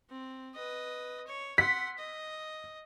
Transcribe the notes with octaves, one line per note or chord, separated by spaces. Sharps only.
C4
B4 D#5
C#5
F#5 C6 B6
D#5